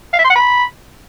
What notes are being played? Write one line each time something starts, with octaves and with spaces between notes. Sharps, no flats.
F5
E5
C6
F#5
B5